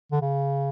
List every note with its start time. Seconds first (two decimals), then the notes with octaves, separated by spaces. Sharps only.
0.12 D3
0.22 C#3